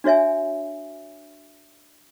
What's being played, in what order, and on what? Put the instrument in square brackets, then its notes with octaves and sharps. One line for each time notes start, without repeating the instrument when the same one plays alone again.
[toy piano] D4 F#4 C#5 E5 G#5